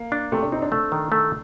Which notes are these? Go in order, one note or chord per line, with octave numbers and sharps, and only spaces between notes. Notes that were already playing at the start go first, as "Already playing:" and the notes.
Already playing: A#3
D4
C3 A3
D4
C4 D#4
D4
A3
D#3
A3